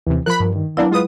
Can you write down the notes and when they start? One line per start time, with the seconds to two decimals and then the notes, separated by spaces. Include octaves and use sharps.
0.07 D#2 C3 E3
0.26 F3 A#4 B5 F#6
0.40 G2
0.56 D#3
0.77 F#3 A#3 B3 D4 E4
0.91 G#3 F4 B4 D#6